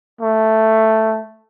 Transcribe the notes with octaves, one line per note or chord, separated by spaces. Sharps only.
A3